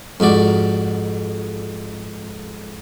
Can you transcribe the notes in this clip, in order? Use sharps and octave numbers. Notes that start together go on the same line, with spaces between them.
F2 G#2 F#4 D5